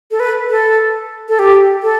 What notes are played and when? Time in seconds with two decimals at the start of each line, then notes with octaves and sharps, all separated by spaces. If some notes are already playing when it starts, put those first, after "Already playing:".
0.11 A4
0.20 B4
0.50 A4
1.29 A4
1.39 G4
1.83 A4